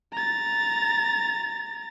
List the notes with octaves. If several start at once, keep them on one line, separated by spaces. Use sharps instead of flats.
A#5 A6